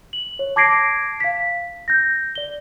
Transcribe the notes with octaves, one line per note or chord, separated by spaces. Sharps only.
F#7
C#5
A5 D6 G#6 A#6 C7 D7
F5 B6
G6 A#6
D5 G7